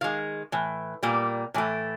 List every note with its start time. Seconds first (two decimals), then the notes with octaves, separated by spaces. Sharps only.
0.01 D#3 G#3 F5
0.52 A2 E3
1.03 A#2 G3 A#3
1.54 A2 E3 A3